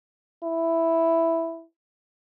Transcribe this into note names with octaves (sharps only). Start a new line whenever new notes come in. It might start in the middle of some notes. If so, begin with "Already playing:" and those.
E4